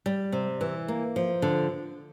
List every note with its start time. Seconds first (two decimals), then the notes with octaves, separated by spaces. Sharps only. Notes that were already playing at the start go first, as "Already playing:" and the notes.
0.06 G3
0.32 C3
0.61 E3
0.88 A#3
1.16 F3
1.42 D3